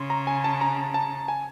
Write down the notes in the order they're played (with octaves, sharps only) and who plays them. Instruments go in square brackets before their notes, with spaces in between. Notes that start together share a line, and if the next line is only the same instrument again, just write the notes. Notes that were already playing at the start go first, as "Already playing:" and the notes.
Already playing: [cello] C#3 [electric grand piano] C6
[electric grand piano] A#5
G#5
A5
A#5
A5
G#5